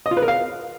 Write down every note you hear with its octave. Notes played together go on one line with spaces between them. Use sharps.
D#5
F4
B4
A#4
F5